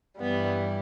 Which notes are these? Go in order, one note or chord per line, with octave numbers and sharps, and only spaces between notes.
G2 E3 G3 B3